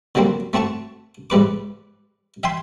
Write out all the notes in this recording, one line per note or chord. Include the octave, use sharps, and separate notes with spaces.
D3 F#3 G3 A#3 C4
A3 C4 F#4 A5 C#6
G#2 G3 B4 D6
E5 G5 G#5 C6